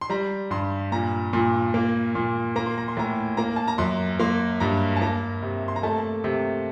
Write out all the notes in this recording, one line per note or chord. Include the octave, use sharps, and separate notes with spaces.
C6
G3 A#5
G2 C6
A#2 A#5
A#2
A#3
A#2
A#3 A#5
C6
A#5
C6
A2 A#5
A#3 A#5
A5
A#5
F#2 C6
A#3 C6
G2 A#5
A5
A#3 A#5
C3
C6
A#5
A3 A5
C3